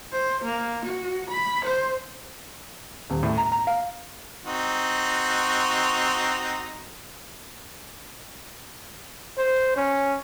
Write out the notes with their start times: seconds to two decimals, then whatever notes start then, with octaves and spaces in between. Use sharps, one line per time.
0.12 C5
0.44 A#3
0.85 F#4
1.30 B5
1.65 C5
3.10 D#1
3.23 A2
3.38 A#5
3.52 A#5
3.67 F5
4.45 C4 D#4 F#4
9.38 C5
9.76 C#4